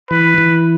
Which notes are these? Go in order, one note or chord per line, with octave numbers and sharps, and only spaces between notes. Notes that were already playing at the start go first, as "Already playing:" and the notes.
E3 B4
E3